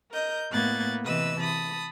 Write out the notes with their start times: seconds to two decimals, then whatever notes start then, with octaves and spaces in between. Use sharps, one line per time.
0.10 A#4 D#5 G6
0.50 A2 A#3 B3 F#6 G#6 A6
1.04 C3 E3 B4 D#5 E6
1.40 A5 B5 D#6